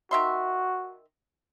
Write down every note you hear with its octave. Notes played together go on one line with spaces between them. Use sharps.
D#3 F#4 E5 C6